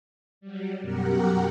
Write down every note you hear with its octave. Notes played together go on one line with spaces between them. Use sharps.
F#3 G3
F#2 B2 G4 A#4 F#5